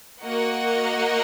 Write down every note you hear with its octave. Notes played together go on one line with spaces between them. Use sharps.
A#3 F#4 A#4 D#5 F#5